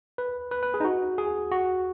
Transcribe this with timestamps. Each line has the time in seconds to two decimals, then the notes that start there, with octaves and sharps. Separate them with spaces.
0.18 B4
0.51 B4
0.63 B4
0.74 G#4
0.80 D#4
0.84 F#4
1.18 G#4
1.51 F#4